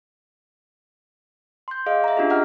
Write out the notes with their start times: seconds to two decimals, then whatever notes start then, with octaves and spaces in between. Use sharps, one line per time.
1.68 C6 G6
1.86 G#4 D#5 F5
2.04 E5 A#5
2.17 C#4 D4 F4 G4 G#4
2.30 D#5 F#5 A#5 F6